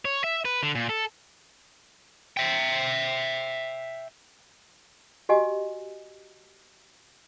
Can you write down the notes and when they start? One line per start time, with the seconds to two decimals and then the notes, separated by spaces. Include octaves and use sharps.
0.05 C#5
0.24 E5
0.45 B4
0.63 D3
0.75 A#2
0.89 A4
2.37 E5 G5
5.29 F#4 G4 D#5 G#5